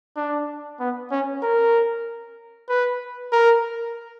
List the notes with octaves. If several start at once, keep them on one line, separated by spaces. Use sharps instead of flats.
D4
B3
C#4
A#4
B4
A#4